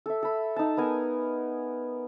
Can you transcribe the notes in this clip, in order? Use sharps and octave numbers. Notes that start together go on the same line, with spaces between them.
A4 E5
A4 B5
D#4 A5
B3 A#4 G#5